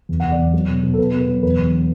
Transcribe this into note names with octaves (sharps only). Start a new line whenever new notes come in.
E2
F#5
E2
D5
E2
F#3
B2
B2
A4
B2 B4
B2
B4
F#3
E2 B4
E2
D3